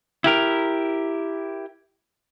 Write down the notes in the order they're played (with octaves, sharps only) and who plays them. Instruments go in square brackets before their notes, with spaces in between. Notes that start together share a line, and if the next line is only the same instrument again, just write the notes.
[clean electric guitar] E4 G4 A#4